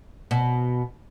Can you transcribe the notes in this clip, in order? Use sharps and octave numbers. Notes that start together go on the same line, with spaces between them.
B2